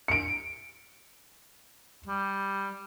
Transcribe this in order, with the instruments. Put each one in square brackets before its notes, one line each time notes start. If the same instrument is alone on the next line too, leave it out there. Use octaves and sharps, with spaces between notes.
[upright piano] C#7 D7
[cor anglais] G3